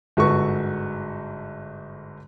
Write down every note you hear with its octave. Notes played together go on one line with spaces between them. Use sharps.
G1 G#2 F#4 A4 B4 C#6